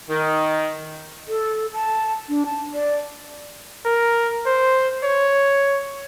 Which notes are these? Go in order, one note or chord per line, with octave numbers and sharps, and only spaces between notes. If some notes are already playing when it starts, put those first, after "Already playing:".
D#3
A4
A5
D4
A5
D5
A#4
C5
C#5